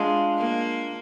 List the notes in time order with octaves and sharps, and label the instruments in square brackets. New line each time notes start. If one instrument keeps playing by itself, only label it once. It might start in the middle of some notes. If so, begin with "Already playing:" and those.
Already playing: [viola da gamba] G#3 [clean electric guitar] D4 F4
[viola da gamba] A#3